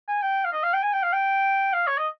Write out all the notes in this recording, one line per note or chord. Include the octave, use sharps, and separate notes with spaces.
G#5
G5
F5
D#5
F5
G5
G#5
G5
F5
G5
F5
C#5
D#5